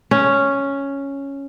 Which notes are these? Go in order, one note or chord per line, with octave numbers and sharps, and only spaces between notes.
C#4